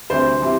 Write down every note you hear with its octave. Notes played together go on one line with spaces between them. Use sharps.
D2 C3 G3 C5
C3 E3 G3